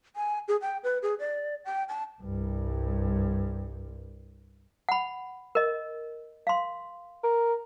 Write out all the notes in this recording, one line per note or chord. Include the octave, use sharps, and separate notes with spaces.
G#5
G#4
G5
B4
G#4
D5
G5
A5
C2 G2
F#5 B5
A#4 D#5
F5 C6
A#4